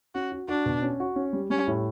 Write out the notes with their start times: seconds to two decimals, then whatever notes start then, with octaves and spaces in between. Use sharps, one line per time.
0.15 C#4 F#4
0.32 F#4
0.49 D4 F#4
0.66 B2
0.82 C#4
1.00 F#4
1.16 C#4
1.33 G3
1.50 G3 C#4
1.67 A2